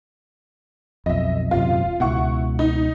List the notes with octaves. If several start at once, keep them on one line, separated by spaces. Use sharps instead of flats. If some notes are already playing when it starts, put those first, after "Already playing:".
B1 F2 D#5 E5
D#1 F#2 C3 F4
C#2 B2 E4 F#5 C#6
D#4